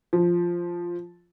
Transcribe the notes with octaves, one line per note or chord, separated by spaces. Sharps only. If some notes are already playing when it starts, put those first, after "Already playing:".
F3